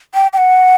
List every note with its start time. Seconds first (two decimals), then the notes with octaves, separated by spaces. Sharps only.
0.14 G5
0.33 G5
0.38 F#5